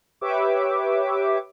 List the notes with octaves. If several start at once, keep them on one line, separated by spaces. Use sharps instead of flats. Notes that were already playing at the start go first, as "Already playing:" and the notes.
G4 B4 C#5 E5 D6